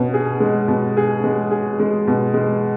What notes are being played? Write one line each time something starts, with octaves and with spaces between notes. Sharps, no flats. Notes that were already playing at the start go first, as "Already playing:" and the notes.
Already playing: B2 C#4
G#4
G#3
B2
G#4
G#3
G#4
G#3
B2
G#3